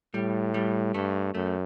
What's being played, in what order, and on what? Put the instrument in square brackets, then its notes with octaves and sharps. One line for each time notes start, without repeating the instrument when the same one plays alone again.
[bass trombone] A2 [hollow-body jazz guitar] G3
[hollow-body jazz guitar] G3
[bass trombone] G2 [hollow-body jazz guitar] A3
[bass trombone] F#2 [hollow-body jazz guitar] A3